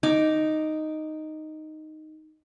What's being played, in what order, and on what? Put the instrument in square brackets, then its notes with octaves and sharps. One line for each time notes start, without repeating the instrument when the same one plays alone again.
[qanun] D#4 D6